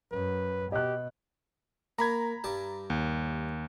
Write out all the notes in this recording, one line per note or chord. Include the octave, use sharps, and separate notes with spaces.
F#2 B4
B2 G4 D#5 F#6
A#3 A#5 B5 G#6
G2 G3 A5
D#2